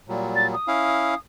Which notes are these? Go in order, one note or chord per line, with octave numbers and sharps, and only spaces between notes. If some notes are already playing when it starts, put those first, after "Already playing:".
A#2 F#3 G3
A6
D#6
C#4 E4 F5